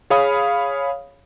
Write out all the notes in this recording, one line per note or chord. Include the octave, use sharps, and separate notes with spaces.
G#4 C#5 F5 B5 D#6